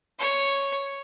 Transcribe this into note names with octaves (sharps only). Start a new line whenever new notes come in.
C#5